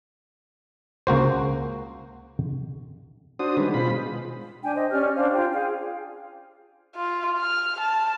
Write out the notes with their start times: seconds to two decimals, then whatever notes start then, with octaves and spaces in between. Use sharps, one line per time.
1.07 C#2 A#3 F#4 C5
3.39 D4 F#4 C5 D#6
3.57 D#3 G3 G#3 C#4 D4 B4
3.74 B2 G#3 F4 C5 B5
4.63 D4 G5 G#5
4.76 C5 D#5
4.92 C#4 G4 D5 F6
5.16 D4 C5 F5
5.34 F4 G5
5.52 G#4 F5
6.96 F4
7.38 F6
7.80 A5